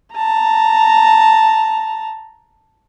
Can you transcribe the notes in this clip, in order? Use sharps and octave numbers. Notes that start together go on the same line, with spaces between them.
A5 A#5